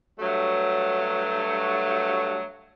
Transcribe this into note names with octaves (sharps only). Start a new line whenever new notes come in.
G2 F#3 A3